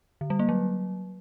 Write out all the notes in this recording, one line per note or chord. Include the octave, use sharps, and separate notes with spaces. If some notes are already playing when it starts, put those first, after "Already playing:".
D3
G3
A#3
F#3